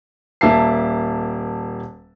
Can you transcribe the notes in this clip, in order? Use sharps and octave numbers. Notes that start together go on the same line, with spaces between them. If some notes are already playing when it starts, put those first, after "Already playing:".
D#1 A#3 E5 A5 C7